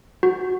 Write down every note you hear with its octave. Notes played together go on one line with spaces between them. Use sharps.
F#4